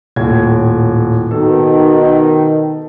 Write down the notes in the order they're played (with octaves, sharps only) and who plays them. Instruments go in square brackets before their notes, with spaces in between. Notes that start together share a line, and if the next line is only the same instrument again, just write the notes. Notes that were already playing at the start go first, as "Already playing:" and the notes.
[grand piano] D#1 A2 G#6
[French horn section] B2 D#3 [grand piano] A4